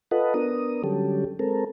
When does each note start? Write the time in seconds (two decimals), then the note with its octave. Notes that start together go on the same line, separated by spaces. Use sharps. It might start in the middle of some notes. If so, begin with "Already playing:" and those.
0.11 F4 A4 B4 D#5 F#5
0.34 B3 D4 A#4 D#6
0.84 D3 F#3 G3 C#4 G4 A4
1.39 G#3 C4 A4 A#4